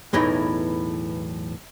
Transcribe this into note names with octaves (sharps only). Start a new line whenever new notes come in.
B1 E2 A2 E3 D#4